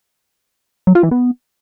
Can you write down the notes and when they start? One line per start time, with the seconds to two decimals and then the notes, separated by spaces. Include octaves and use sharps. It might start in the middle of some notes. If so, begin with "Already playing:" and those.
0.87 F#3
0.95 F4
1.03 E3
1.11 B3